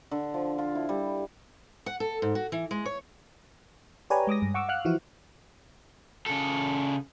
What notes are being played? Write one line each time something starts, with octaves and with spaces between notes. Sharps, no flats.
D3
F3
F4
E4
G3
F#5
A4
G#2
F#4
E3
G#3
C#5
G4 B4 C#5 D5 G#5 A#5
G#3 D6 D#6 A#6
G2
F#5 C#6 D6 E6
F5 F#5 F6 F#6
E3 F3 E4 F#4
C#3 A4